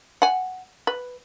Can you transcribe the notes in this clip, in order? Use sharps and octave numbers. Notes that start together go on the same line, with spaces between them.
F#5 G#5
B4